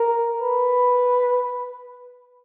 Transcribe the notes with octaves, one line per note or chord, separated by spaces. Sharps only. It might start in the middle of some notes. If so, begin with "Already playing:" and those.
Already playing: A#4
B4